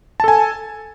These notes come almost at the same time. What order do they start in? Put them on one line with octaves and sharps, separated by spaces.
A5 A4 G#5